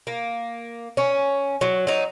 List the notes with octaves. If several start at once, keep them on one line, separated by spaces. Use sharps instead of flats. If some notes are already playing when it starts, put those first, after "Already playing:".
A#3
C#4
F#3
F#3 D#4